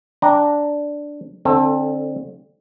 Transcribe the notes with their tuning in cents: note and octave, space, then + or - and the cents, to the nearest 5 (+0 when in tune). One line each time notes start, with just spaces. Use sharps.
D4 +0 G5 +0 A#5 -10
D3 +20 C4 +30 A4 +0